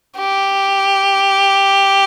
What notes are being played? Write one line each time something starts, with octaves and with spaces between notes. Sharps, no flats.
G4